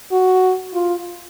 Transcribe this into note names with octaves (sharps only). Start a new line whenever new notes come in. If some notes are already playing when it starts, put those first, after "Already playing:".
F#4
F4